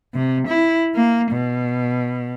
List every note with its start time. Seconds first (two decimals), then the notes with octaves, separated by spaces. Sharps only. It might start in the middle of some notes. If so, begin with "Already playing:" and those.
0.14 C3
0.48 E4
0.96 A#3
1.32 B2